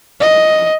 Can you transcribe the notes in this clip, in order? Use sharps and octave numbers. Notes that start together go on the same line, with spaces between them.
D#5